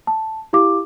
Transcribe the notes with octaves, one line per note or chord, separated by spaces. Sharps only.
A5
E4 G4 F5 D6